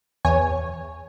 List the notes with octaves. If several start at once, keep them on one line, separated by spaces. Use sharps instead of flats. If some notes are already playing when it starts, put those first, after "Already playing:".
E2 C#5 G#5